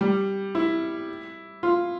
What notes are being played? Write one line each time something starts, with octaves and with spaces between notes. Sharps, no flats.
G3
E4
F4